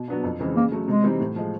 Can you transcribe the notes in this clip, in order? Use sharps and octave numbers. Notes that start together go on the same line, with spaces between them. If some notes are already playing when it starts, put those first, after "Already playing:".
Already playing: B2
F#3 B3 D4
F2
C#3 E3 G#3 C4
C#3 A#3
F#3 A3
C3 G#3
E3 G3 C4 D#4
A2
F3 G#3